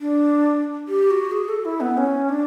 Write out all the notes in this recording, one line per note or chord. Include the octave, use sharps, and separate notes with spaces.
D4
G4
F#4
G#4
A4
E4
B3
C#4
D4